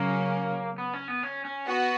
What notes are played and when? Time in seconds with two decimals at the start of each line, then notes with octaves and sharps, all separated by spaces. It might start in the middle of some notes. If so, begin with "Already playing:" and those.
Already playing: C#3 F#3 A#3 C#4
0.78 B3
0.93 C#4
1.08 B3
1.23 C#4
1.45 C#4
1.67 B3 F#4